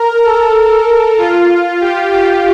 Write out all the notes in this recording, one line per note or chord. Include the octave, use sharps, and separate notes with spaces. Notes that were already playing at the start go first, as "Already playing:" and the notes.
Already playing: A#4
A4
F4
G4
G4